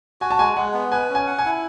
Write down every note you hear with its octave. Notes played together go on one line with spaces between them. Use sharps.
F#4 G#5
A5
G#3 G#5
G#3 F#5
B3
B4 G#5
C#4
G#5
F#5
G#5
E4